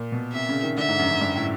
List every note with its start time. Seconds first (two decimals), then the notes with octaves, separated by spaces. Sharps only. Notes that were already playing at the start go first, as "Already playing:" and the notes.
Already playing: A#2
0.12 B2
0.33 C3 E5
0.49 C#3
0.63 D#3
0.77 D3 E5
0.88 G#2
0.99 F#2
1.11 F#2
1.21 G2
1.36 A2